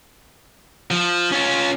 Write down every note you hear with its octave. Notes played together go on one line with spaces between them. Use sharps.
F3
C#4 F4